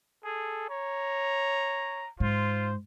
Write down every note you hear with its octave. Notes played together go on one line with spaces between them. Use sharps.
G#4 A4
C#5 A#5
G#2 F4 C5